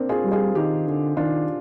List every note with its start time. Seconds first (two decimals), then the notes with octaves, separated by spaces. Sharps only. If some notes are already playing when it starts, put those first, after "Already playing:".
Already playing: A#3 C4 D4
0.09 F4 G#4
0.24 G3
0.31 F4 G#4
0.55 D#3 D#4 G4
0.87 D3
1.17 D#3 D4 F4